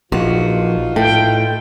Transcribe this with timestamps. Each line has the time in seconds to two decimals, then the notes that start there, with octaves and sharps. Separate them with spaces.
0.12 A#1 E3 D#4 F4 F#4
0.96 A2 A4 G5